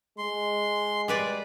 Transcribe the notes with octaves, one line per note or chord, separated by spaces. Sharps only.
G#3 C6
G3 B4 D5